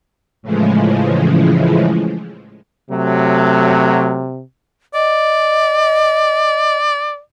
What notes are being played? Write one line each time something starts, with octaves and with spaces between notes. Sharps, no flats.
A2 C#3 E3 F3 G#3
C3 F#3 A3
D5 D#5